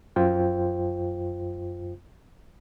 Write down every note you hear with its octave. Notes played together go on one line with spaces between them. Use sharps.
F#2 F4 C5 G5